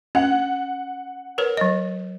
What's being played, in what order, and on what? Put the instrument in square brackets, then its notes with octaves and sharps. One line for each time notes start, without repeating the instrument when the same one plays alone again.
[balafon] C#4 [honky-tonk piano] F#5
[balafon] A#4 B4 C#5
F#3 D#5